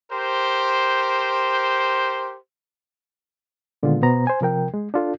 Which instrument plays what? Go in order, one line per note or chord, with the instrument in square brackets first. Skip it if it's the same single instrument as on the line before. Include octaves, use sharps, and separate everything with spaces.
[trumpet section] G4 A#4 C5
[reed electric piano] A#2 D3 D#3 G#3 B3 F4
B2 B3 C5 A#5
C5 G#5
C3 F3 A#4 G5
G#3
D4 F4 A4